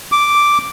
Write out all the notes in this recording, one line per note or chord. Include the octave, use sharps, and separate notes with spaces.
D6